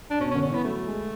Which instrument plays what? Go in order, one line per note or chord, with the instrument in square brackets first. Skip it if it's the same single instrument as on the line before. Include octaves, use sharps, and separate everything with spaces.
[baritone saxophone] D4
[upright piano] B2 [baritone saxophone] C#4
[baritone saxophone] C#4
[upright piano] D3
[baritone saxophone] C#4
[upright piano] E3 [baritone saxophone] B3
[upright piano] F#3 [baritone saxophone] A3
[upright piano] G#3